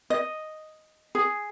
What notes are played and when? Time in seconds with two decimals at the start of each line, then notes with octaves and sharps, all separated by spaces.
0.10 D#5
1.15 G#4